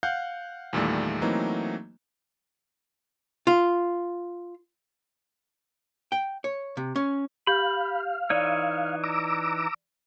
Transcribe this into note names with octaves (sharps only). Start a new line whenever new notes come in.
F5 F#5 F#6 G6
E2 A#2 D#3 G3 A3
E3 F#3 A3 A#3 C4 D#4
F4
G5
C#5
C3
C#4
G4 F5 B5 G6
E3 D#4 C#5 D5
A#5 D6 E6